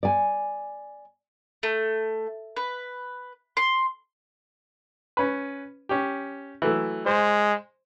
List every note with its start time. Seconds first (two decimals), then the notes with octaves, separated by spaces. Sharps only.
0.03 D5 G#5
1.63 A3
2.57 B4
3.57 C6
5.17 C#4 B4
5.89 C#4 G4
6.62 E3 F#3 A3
7.06 G#3 C5